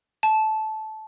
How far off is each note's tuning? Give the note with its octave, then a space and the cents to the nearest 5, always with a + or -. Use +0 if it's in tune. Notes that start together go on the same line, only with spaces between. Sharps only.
A5 -15